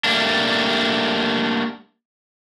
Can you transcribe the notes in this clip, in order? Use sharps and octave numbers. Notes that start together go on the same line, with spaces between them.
G3 A3 A#3 D4